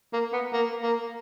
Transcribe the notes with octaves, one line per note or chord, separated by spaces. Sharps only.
A#3
B3
A#3
A#3